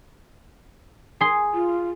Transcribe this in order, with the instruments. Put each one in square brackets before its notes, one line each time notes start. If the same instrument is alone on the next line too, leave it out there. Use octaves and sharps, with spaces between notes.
[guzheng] G#4 C6
[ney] F4